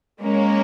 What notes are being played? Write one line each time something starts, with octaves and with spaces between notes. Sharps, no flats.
G#3 A#3 C#4 A#4 C#5